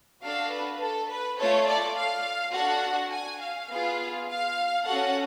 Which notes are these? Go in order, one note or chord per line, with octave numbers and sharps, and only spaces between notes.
D4 F#4 A4 F5
B4
A4
B4
A3 F4 A4 C#5
D5
F5
D4 F#4 A4 F#5
G#5
F5
B3 F4 G#4
F5
C#4 F#4 A4 F#5